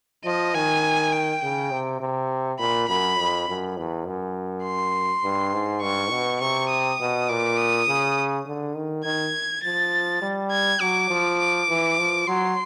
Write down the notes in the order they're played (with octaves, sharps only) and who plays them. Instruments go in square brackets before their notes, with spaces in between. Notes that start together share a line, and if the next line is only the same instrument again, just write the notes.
[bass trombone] F3 [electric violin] D#5
[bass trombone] D#3 [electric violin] G#5
[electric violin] G5
[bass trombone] C#3
C3
C3
[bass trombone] A#2 [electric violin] B5
[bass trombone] F#2 [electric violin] B5
[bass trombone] F2
F#2
E2
F#2
[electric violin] C6
[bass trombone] G2
G#2
[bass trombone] G2 [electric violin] C#6
[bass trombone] B2
[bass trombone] C3 [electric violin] C#6
[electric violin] D#6
[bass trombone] B2
[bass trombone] A#2 [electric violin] D6
[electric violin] D#6
[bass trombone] C#3
D3
D#3
[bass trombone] D#3 [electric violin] G#6
[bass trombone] F3 [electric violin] A6
[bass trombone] G3
[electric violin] G#6
[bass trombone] F#3 [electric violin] D6
[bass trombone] F3
[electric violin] D6
[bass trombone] E3
F3
[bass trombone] F#3 [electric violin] C6